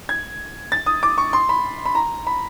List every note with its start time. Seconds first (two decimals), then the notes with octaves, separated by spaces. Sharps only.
0.09 G#6
0.72 A6
0.86 D#6
1.03 D6
1.18 C#6
1.33 C6
1.49 B5
1.85 B5
1.95 A#5
2.27 B5